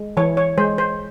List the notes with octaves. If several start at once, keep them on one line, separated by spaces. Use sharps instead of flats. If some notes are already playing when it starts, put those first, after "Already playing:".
Already playing: G#3
E3 C#5
C#5
G#3 C5
C5